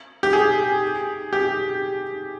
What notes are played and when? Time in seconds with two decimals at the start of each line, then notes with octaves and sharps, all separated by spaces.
0.23 G4
0.33 G#4
1.33 G4